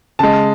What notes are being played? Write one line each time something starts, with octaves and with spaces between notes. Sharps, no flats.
C#3 G#3 A5